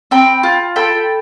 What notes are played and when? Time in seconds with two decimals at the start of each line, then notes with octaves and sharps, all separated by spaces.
0.11 C4 G5 B5
0.43 F4
0.76 A4 G5 B5